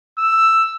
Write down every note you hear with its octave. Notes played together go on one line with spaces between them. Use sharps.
E6